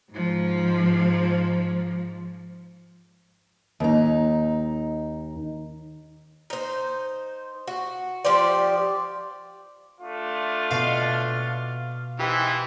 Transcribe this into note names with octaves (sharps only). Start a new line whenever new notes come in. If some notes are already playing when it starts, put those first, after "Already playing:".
G#2 F3
D#2 D#4
D#4 C5
F#4
F3 G4 C5 D5
A3 D4 F4
B2 F5
E3 D#4 E4 G4 C5